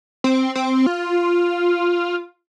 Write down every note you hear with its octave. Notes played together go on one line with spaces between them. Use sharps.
C4
C4
F4